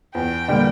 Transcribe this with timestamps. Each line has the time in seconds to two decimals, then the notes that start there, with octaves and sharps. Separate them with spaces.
0.15 E2 G5
0.48 D3 G3 A#3